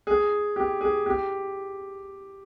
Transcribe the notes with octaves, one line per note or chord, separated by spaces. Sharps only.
G#4
G4
G#4
G4